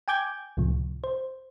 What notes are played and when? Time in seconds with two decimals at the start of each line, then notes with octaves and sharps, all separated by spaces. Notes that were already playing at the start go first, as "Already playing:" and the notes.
0.08 G5 G#5 D6 G6 G#6
0.57 C#2 A2 C3 F3
1.04 C5